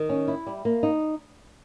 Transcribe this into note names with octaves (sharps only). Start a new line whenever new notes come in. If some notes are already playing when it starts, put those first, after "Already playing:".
Already playing: D#3
C#4
E4
G3
A#3
D#4